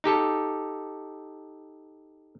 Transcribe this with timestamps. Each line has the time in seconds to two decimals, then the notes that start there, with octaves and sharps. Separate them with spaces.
0.04 D#4 G4 A4